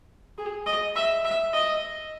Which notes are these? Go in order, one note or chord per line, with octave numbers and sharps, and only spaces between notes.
G#4
D#5
E5
E5
D#5